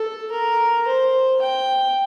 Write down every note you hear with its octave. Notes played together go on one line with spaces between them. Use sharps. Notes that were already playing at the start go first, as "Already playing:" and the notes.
Already playing: A4
A#4
C5
G5